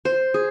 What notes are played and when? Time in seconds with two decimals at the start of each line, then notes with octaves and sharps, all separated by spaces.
0.05 C5
0.34 G#4